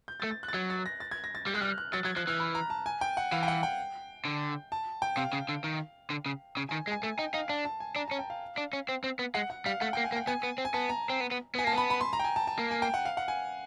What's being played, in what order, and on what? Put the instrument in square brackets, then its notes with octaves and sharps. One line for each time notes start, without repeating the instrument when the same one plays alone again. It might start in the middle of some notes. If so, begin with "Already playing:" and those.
[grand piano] G6
A6
[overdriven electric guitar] A3
[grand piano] A6
F#6
A6
[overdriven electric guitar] F#3 [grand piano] G#6
[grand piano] A6
A#6
A6
G#6
A#6
A6
[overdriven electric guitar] G3 [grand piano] G6
[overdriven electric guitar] G#3 [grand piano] F#6
[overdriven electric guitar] G3 [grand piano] F6
[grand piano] F#6
[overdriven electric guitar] F#3 [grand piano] A6
[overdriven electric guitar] F#3 [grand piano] G#6
[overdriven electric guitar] F3 [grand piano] F#6
[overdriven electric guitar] E3 [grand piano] F6
[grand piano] B5
A#5
A5
G#5
G5
F#5
[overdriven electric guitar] E3 [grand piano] F5
[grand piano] G5
F#5
G5
[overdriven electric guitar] D3
[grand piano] A5
G5
[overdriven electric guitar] C3 [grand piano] F5
[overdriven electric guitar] C#3
D3
D#3
D3
C#3
C#3
[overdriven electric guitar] D#3 [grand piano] G#5
[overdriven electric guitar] G#3
[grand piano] G#5
[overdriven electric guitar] A3 [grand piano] G#5
[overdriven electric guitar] D#4 [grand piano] G5
[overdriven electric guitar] D#4 [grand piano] F5
[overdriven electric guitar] D4 [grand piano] A5
[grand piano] A5
G#5
[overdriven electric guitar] D4 [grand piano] A#5
[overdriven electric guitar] C#4 [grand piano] A5
[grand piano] G5
F5
[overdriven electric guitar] D4
C#4
C4
C4
B3
[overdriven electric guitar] G#3 [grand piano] F#5
[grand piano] F#5
[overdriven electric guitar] G3 [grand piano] F5
[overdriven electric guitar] A3 [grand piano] F#5
[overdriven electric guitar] A#3 [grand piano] G5
[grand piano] G#5
[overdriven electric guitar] A#3
[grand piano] G5
[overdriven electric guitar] B3 [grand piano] G#5
[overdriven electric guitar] B3
C4
[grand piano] G#5
[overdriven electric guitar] B3 [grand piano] A5
[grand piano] A#5
[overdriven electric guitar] C4
B3
B3
[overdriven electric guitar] B3 [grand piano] G#5
[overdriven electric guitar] A#3 [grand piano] A5
[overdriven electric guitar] B3 [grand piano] B5
[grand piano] B5
C6
A#5
G5
G#5
A5
A5
[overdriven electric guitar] A#3
[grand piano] G#5
G5
F#5
F5
F#5
G#5